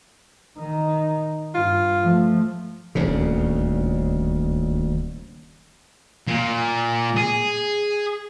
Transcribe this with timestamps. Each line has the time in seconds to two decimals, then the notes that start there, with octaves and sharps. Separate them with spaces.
0.58 D#3 D#4
1.55 G2 F4
2.01 F3 A3
2.95 D#1 D2 C#3
6.28 A#2
7.17 G#4